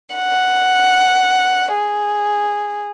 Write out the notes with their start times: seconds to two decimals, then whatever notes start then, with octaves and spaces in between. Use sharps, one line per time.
0.15 F#5
1.73 G#4